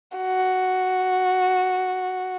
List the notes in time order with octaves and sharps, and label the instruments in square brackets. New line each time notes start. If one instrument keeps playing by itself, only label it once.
[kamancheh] F#4